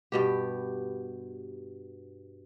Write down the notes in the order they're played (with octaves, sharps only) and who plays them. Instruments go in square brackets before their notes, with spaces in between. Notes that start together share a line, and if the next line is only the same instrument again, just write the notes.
[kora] G2 B2 G4